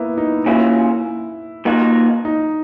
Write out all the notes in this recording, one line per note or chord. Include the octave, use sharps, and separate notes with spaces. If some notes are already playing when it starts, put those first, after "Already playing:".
Already playing: A#3 B3 E4
D#4
A#2 A#3 C#4 E4 F#4
A#2 A#3 D#4 F#4
D#4